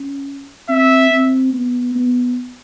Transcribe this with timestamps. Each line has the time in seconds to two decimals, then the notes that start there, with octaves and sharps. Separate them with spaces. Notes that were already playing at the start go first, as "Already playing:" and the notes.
Already playing: C#4
0.69 C4 E5
1.11 C4
1.53 B3
1.96 B3